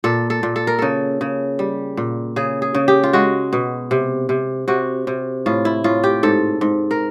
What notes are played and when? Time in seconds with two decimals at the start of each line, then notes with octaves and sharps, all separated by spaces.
0.04 A#2 A4
0.30 A4
0.43 A#2
0.56 A4
0.67 A#4
0.79 C#3 A4
1.21 C#3
1.59 G3
1.97 A#2
2.36 C#3 G#4
2.62 G#4
2.75 C#3
2.88 G4
3.03 F4
3.13 G#3 F#4
3.53 B2
3.91 C3
4.29 C3
4.68 C3 F#4
5.07 C3
5.46 A2 F4
5.65 E4
5.84 A2 F4
6.04 G4
6.23 G#2 A4
6.61 G#2
6.91 A#4